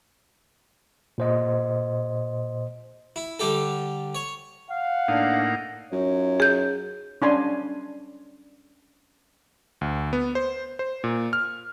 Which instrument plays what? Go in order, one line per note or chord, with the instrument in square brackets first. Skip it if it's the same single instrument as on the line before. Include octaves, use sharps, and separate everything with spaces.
[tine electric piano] A#2 C5 D#5
[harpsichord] E4
D3 G3 G4 A4
C#5
[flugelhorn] F5 [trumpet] F#5
[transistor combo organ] A2 A#3 D#4 [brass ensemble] D4
[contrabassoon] F#2 [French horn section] D#4 F4 C#5
[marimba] G#4 G6
[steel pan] C#4 D4 G#5 C6
[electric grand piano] D2
B3
C5
C5
A#2
F6